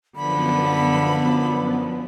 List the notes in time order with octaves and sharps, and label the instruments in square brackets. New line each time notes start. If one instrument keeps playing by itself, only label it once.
[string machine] F#2 F3 B3 [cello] D3 [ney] B5